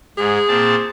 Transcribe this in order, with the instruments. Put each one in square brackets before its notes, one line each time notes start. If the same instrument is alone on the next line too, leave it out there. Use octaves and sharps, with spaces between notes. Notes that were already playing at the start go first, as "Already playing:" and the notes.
[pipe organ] G#2 [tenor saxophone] G#4
[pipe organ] A#2 C4 A5